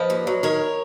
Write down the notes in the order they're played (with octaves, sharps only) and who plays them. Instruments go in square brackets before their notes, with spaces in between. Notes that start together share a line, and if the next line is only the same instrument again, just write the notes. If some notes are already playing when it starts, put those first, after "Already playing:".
Already playing: [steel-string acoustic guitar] F3 B4 D#5
D#2
F#3
D#3 A#4 C#5